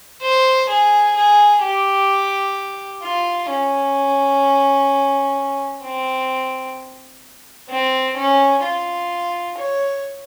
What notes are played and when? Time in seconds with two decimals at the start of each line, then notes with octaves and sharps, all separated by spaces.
0.22 C5
0.69 G#4
1.16 G#4
1.62 G4
3.03 F4
3.50 C#4
5.83 C4
7.69 C4
8.17 C#4
8.64 F4
9.57 C#5